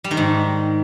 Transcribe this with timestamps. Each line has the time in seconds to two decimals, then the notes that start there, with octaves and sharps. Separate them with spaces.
0.04 G3
0.11 D#3
0.17 G#2